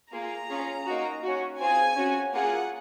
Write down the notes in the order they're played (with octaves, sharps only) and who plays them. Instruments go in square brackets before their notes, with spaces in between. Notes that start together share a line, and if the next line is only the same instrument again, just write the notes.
[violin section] A#3 F4 G#4 A#5
C#4 F4 G#4
A#3 D#4 F#4
C#4 F#4
C4 F4 G#4 G#5
C#4 F#4
A#3 F4 G#4 F#5